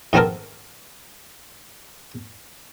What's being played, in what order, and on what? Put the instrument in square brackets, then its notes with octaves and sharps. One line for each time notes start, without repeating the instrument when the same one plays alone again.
[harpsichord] G#2 D#3 B3 C4 A4 A#4